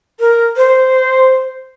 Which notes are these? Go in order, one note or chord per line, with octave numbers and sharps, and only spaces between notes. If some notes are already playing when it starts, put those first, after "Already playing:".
A#4
C5